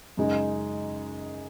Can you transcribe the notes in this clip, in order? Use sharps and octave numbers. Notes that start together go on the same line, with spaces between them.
F#2 C#3 G#3 D#4